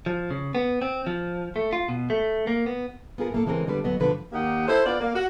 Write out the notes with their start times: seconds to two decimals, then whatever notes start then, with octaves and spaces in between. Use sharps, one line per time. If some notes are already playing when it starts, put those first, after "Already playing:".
0.06 F3
0.31 C#3
0.55 B3
0.82 C4
1.07 F3
1.56 A3
1.73 F4
1.89 B2
2.10 A3
2.47 A#3
2.66 B3
3.18 B3 F4 G#4 A#4
3.32 A2 A#3 A4
3.46 C#3 E3 G#3 C4 A#4
3.67 D3 G3 B3 B4
3.84 D2 F#3 B3 D#5
4.00 G2 B2 D3 F3 B4
4.32 D#2 A#3 D#4 G4 F#5
4.68 E4 A4 C5
4.85 B3 F4 D5
4.99 A#3
5.14 F#4